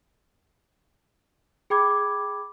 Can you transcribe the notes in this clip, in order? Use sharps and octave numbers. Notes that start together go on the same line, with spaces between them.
G#4 G5 B5 D6 G#6